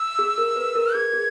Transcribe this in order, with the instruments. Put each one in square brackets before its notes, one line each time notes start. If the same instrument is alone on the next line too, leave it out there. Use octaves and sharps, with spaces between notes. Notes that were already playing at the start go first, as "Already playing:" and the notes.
Already playing: [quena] E6
[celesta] G#4
A#4
B4
A#4
[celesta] G#4 [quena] G#6
[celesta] G#4